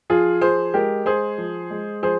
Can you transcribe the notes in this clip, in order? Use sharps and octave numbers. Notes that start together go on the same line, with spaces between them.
F3 F4 G#4
F3 G#4 C5
G#3 G4 A#4
G#3 G#4 C5
F3
G#3
F3 G#4 C5